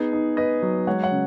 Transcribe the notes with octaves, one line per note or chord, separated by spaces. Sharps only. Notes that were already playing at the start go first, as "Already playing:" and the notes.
Already playing: B3 D#4 G#4
D#4
D#4 B4 D#5
F#3
G#3 C#5 F#5
C#5 F#5
C#3